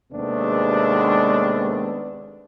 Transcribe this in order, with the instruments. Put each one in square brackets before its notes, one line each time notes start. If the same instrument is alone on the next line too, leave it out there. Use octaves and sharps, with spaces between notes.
[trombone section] D#2 C3 G#3 A3 B3 D4